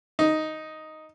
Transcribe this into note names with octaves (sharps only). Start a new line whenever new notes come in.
D#4